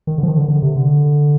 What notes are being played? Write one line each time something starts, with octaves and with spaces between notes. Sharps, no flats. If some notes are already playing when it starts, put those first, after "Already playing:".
D#3
D3
F3
D#3
D3
D3
C3
D3